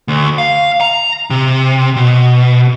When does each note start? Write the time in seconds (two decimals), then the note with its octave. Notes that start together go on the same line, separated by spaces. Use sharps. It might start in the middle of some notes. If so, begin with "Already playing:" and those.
0.08 D2
0.38 F5
0.81 A#5
1.30 C3
1.96 B2